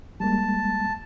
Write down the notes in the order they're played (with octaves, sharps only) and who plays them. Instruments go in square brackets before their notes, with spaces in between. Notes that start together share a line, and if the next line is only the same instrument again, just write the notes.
[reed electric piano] G3 G#3 A#3 [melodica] A5